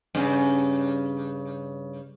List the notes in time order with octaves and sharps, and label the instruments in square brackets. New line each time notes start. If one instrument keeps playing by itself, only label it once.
[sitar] G2 C#3